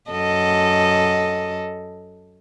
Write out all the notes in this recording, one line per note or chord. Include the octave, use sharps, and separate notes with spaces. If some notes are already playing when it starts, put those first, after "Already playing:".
F#2 A4 D#5